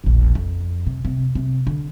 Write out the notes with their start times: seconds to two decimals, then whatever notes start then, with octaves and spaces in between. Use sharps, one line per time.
0.04 E1 A#1
0.35 F2
0.86 C3
1.05 C3
1.35 C3
1.67 D3